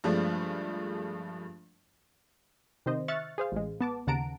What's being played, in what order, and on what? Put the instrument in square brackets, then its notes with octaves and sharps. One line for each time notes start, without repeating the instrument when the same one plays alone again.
[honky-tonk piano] G2 F3 G#3 A3 D4 F4
[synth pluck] C3 D#3 C5 D#5
E5 C#6 F6 F#6 A6 C#7
G#4 C5 F5
A1 G#3
B3 A5 D6
D#2 C#3 F#5 A5 A#5 D7